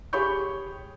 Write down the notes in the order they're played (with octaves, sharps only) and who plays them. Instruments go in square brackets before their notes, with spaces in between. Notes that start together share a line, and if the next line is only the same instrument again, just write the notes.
[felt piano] G4 G#4 C#5 B5 C#6 G6